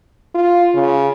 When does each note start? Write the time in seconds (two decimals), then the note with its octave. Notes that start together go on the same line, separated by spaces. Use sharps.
0.35 F4
0.75 C#3